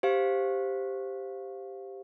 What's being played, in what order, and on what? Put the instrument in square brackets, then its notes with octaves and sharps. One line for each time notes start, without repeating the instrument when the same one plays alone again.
[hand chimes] G4 C5 F5